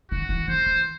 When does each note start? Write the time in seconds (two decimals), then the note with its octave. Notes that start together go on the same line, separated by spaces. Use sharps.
0.11 D3 F#4
0.29 E3
0.48 D3 C5
0.66 E3